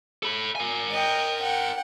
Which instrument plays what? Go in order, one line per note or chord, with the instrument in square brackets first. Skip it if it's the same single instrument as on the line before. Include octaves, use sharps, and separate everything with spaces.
[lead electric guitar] A4 B5
A#4 G#5
[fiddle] D#5 G5
F#5 G5